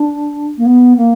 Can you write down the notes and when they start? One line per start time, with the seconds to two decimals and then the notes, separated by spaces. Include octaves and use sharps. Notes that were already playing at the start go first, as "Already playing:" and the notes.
Already playing: D4
0.57 A#3
0.65 B3
0.97 A#3